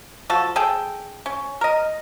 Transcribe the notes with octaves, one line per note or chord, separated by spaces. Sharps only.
F3 F#4 A4
G#4 A4 G5
C#4
A#4 D#5